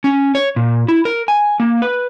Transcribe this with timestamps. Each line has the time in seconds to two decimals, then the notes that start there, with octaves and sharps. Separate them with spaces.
0.04 C#4
0.35 C#5
0.56 A#2
0.88 E4
1.05 A#4
1.28 G#5
1.60 A#3
1.82 B4